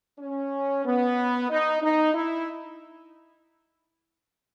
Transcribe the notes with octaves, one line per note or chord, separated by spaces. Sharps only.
C#4
B3
D#4
D#4
E4